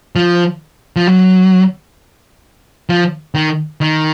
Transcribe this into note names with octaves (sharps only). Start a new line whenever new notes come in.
F3
F3
F#3
F3
D#3
D#3